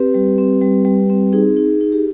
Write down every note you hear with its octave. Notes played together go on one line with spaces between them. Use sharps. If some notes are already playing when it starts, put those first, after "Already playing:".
Already playing: C4 G4 B4
G3
C4
G3
G3
C4
D#4 G#4
D#4
D#4
G4